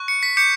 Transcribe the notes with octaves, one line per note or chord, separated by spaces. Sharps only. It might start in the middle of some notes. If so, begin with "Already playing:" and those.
Already playing: C#6 F#6
C#7
B6
D6 G6 C#7